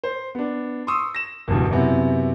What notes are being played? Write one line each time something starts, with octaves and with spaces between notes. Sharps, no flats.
C5
B3 D4
C6 C#6 D#6 E6
A#6 E7
F#1 E2 G2 B2
F#2 C3 B3 C4 E4